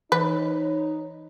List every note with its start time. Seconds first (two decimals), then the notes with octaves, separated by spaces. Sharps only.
0.12 E3 D#4 B4 C#5